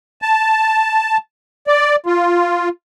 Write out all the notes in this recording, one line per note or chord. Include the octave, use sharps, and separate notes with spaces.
A5
D5
F4